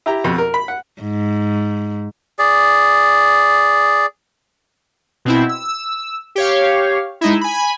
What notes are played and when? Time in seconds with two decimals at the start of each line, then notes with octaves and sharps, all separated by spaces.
0.06 E4 G4 A#5
0.24 F2 B2
0.38 A#4
0.54 B5
0.68 F#5
1.02 G#2
2.39 G#4 D5
5.25 B2 C4 E4
5.49 E6
6.35 G4 C#5 F5
7.21 G#3 D#4 E4
7.41 G#5 B5